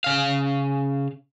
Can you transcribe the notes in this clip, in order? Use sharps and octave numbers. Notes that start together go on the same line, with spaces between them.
C#3 F5